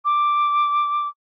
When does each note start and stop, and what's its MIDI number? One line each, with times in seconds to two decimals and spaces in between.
0.05 1.08 86